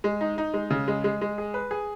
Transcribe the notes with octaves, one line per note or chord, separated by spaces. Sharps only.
G#3
D#4
D#4
G#3
C#3
G#3
G#3
G#3
G#4
B4
G#4